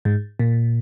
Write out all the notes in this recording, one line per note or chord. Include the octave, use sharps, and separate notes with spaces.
G#2
A#2